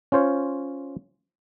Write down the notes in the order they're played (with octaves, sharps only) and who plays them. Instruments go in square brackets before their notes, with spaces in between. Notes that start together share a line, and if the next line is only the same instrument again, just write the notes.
[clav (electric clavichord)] C#4 F4 C5 C#5